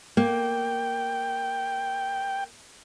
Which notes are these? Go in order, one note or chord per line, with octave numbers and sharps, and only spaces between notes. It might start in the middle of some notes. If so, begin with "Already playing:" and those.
A#3 G5